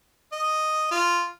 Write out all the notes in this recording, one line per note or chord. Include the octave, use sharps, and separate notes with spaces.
D#5
F4